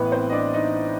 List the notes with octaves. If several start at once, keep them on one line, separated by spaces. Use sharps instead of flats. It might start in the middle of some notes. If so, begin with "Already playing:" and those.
Already playing: A1 A2 E3 B3 B4
C4 C5
D#5
D4 D5
D#4 D#5